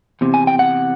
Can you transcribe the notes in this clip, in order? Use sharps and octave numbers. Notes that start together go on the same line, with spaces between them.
E2 C3
G#5
G5
F#5